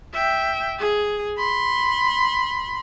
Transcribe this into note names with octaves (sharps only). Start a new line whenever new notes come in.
E5 G5
G#4
B5 C6